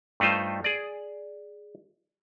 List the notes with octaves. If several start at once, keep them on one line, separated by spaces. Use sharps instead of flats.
G2 A3 D#4 F4 C5
G#4 D5